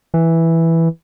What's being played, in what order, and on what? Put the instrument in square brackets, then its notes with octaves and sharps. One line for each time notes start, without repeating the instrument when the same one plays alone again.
[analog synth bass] E3